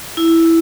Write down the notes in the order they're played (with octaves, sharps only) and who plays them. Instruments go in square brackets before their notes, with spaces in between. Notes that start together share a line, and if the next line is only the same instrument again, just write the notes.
[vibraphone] E4